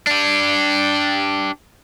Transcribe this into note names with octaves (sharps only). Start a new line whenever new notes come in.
D4 G4